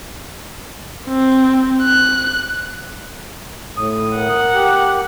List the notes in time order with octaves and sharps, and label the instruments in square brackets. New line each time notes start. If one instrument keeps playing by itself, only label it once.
[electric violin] C4
F#6
[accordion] A2 D#6
[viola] A#4 F#5
[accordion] G4